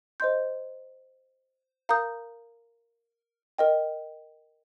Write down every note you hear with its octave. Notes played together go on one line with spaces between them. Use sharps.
C5 D#5 C6 G6
A#4 F5 A#5 D#6 G6
A#4 D#5 G5